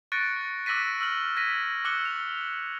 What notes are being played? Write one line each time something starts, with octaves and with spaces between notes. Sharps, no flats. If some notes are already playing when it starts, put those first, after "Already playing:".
C#6 F#6 A6 A#6 C#7 D7
D6 E6 F#6 A#6 B6 D#7
E6 F6 F#7
G#6 A#6 B6 D#7
D6 E6 F#6 C#7 G7
F7